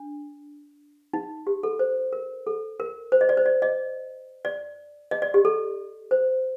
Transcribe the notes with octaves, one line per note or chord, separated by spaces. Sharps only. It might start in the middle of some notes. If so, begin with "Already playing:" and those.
Already playing: D4
D#4
G4
A4
C5
A#4
A4
A#4
C5
D#5
D5
C5
D5
D#5
D5
D#5
D5
G4
A4
C5